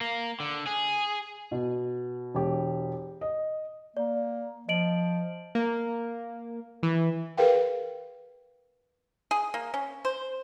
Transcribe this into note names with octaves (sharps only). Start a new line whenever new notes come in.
A#3
D3
G#4
B2
E1 G4
D#5
A#3 D5
F3 D#5 D7 F#7
A#3
E3
G#4 A#4 B4 F5 G5
G#4
A#3
C#4
C5